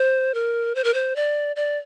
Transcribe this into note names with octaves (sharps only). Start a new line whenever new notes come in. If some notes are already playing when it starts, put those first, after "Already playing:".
Already playing: C5
A#4
C5
A#4
C5
D5
D5